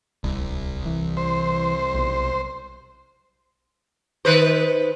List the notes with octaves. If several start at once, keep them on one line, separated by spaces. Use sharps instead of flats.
D1 C2
E3
C5
B1
D#3 B4 C5